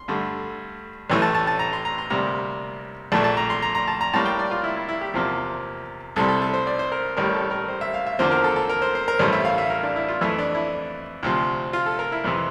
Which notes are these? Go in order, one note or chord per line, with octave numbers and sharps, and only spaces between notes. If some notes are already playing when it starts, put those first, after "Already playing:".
Already playing: C6
G2 D3 A3
A1 A2 E3 A3
A5
A5
A5
A#5
C6
A#5
C6
D2 C3 G3 A#3 A#5
A#1 A#2 A3 A5
A5
A#5
C6
A#5
A#5
A5
A#5
A2 G3 A#3 A5
G5
D5
F4
E4
E4
E4
G4
E2 C3 F3 A#3
C2 C3 G3 A4
A4
A4
C5
D5
C5
A#4
A1 A2 G3 A#4
A4
A#4
C5
E5
F5
E5
E2 D3 F3 A#3 C5
A#4
A4
A4
A#4
C5
C5
A#4
A1 G2 E3 A3 C5
E5
F5
E5
A#4
D4
E4
F4
F2 E3 A3 E4
D4
E4
D2 C3 F3
F4
A4
A#4
E4
F2 C3 E3